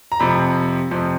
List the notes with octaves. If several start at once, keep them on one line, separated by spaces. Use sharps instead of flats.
A#5
F2 C3 F3 B5
F2 C3 F3